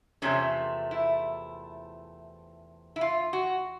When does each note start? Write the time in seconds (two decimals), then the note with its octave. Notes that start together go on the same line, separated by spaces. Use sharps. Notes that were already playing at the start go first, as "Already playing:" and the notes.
0.22 E2 C3 F3 A3 C#4
0.91 E4
2.96 E4
3.01 F4
3.33 F#4